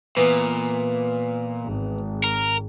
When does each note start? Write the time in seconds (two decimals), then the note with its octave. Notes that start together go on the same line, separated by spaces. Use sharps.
0.17 A#2 E3 B3
1.64 G#1
2.24 A#4